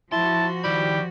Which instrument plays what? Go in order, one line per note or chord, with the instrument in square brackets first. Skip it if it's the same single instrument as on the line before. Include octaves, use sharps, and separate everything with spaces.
[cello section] F3 F#4 [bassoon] E4 [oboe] A5 [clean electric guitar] C6
[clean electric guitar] D#3 E4 B5 [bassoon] G3 [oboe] G4